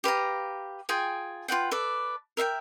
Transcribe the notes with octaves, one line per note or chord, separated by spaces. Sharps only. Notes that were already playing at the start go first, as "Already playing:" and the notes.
G4 B4 F5 A#5
F4 G#4 G5 G#5
F4 B4 F#5 G5
A4 B4 D5
A#4 E5 F5 G5